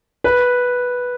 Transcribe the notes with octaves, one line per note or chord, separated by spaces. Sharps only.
B4